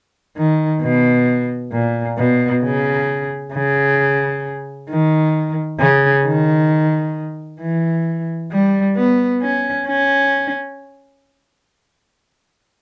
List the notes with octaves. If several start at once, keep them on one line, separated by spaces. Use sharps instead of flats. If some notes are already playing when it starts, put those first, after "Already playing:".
D#3
B2
A#2
B2
C#3
C#3
D#3
C#3
D#3
E3
G3
B3
C#4
C#4